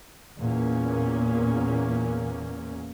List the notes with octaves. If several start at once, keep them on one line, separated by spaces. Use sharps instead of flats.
E2 A#2 A#3 C#4